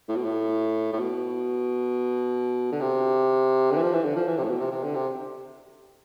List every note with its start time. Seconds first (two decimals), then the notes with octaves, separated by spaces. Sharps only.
0.09 A2
0.16 B2
0.24 A2
0.93 A2
0.99 B2
2.72 D3
2.81 C3
3.71 D3
3.77 E3
3.83 F3
3.93 E3
4.05 D3
4.16 F3
4.28 E3
4.38 C3
4.44 A2
4.50 B2
4.60 C3
4.72 C3
4.83 D3
4.95 C3